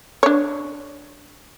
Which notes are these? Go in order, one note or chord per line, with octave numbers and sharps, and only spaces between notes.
D4 C#5